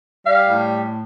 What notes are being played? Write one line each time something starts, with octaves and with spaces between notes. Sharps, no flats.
G3 F5
A2